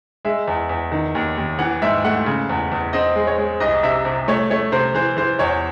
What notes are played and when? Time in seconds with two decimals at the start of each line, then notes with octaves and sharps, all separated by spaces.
0.25 G#3 E5
0.48 E2
0.69 E2
0.92 D#3
1.15 D#2
1.38 D#2
1.59 E3 F#5
1.82 G#2 E5
2.05 A3 F#5
2.26 C#3
2.49 E2
2.72 E2
2.93 C4 D#5
3.16 G#3
3.27 C#5
3.38 G#3
3.60 C2 D#5
3.83 C3 E5
4.05 C3
4.28 A3 C#5
4.50 A3 C#5
4.72 C3 C5
4.95 E3 C5
5.17 E3 C5
5.39 E2 C#5